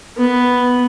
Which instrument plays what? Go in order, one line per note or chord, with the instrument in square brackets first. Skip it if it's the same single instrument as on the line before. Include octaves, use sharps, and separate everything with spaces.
[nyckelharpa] B3